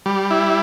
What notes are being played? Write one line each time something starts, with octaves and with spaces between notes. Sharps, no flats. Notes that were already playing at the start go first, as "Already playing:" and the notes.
G3
E4